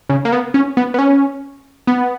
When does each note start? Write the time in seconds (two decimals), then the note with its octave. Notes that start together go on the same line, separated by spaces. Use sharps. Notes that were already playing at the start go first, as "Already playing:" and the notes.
0.09 C#3
0.25 A#3
0.32 B3
0.54 C#4
0.77 B3
0.94 B3
0.99 C#4
1.87 B3